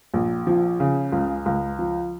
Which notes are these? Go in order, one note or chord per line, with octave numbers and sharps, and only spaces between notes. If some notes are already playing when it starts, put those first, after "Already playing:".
A#1
F3
C#3
C#2
C#2
F3